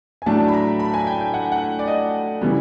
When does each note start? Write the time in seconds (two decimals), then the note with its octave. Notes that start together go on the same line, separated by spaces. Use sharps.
0.22 G#5
0.26 A2 F#3 A3 D4 A5
0.48 B5
0.53 A#5
0.80 B5
0.94 G#5
1.07 G5
1.21 G5
1.34 F#5
1.52 F#5
1.79 D5
1.88 D#5
2.41 C#3 E3 G3 B3